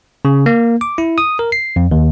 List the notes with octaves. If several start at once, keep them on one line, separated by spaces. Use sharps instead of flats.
C#3
A#3
D6
E4
D#6
A#4
C7
F2
D#2